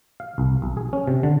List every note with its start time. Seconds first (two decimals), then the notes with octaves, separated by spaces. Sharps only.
0.20 F5
0.38 C2
0.62 B1
0.77 G#4
0.93 C#4
1.07 C3
1.23 D3